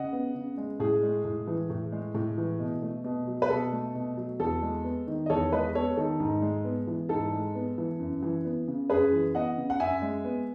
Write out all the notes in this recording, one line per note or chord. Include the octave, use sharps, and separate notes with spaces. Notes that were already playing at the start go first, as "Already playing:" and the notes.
Already playing: C#3 D#5 F#5
B3
C#3
G#3
A2 G#4
G#3
A2
E3
A2
G#3
A2
E3
B2
A3
B2
F#3
B4
B2 A4
A3
B2
F#3
E2 A4
G#3
B3
D#3
D#5
E2 A4 C#5
G#3 B4 D#5
B3 A4 C#5
D#3 A4
G#2
G#3
B3
E3
G#2 A4
G#3
B3
E3
F#2
E3
B3
C#3
F#2 G#4 B4
E3
B3 D#5 F#5
C#3
F#5
F#2 E5 G#5
G#3
B3